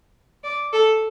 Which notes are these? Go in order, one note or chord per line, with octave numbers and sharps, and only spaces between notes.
D5
A4